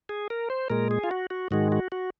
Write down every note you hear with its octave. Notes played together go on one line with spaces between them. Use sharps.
G#4
A#4
C5
A#2 G#3 A#4
G#4
F4
F#4
F#4
G#2 D#3 G#3 F#4
F#4
F#4